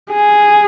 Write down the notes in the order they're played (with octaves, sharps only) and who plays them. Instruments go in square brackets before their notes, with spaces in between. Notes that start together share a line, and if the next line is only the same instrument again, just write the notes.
[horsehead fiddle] G#4